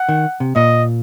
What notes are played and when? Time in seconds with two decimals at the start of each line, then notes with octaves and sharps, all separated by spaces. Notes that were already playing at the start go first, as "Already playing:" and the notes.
Already playing: F#5
0.09 D#3
0.40 C3
0.56 A#2 D#5